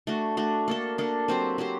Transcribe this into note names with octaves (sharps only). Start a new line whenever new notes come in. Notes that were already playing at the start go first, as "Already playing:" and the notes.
A3 D4 F#4
A3 D4 F#4
A#3 D4 A4
A#3 D4 A4
F#3 C4 G4 C5
F#3 C4 G4 C5